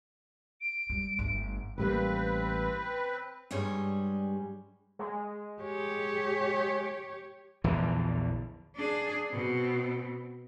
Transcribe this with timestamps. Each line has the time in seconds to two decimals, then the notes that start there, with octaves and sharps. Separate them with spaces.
0.60 D7
0.90 G3
1.19 G1 A3
1.78 A1 G3 A#3 C4 B4
3.51 G2 G3 G#3 C#5
4.99 G#3
5.62 G4 C#5
7.64 A#1 E2 D3 E3
8.76 D4 G#4
9.30 B2 C4